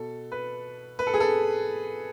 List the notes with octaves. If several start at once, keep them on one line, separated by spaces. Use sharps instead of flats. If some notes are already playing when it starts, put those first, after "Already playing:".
Already playing: B2 A4
B4
B4
A4
G#4
A4